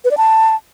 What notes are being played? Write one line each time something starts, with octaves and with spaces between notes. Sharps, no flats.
B4
D5
A5